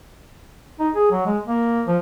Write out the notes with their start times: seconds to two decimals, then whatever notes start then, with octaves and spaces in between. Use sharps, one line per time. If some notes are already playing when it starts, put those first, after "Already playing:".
0.79 D#4
0.95 G#4
1.11 F#3
1.26 G#3
1.46 A#3
1.87 F3